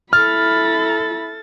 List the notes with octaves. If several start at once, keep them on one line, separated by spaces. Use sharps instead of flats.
E4 A4 B5 F6 A6